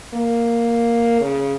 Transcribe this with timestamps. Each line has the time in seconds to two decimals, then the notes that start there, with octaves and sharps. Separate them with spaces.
0.14 A#3
1.21 C#3